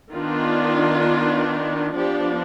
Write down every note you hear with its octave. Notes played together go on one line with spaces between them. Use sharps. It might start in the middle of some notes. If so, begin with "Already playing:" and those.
D#3 B3 D4 F4
F3 B3 D4 G4